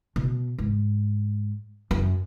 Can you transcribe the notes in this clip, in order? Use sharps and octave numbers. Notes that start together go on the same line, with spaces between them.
B2
G#2
F#2